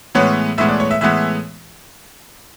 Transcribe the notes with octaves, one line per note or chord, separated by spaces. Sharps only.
A2 E3 G#3 B3 C#5
A2 E3 G#3 B3 E5
D5
C#5
E5
A2 E3 G#3 B3 E5